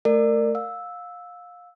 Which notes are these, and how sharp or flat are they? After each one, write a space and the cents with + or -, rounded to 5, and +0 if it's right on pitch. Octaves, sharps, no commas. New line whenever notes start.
A3 +0 A#4 -20 D5 +20
F5 +25 E6 -5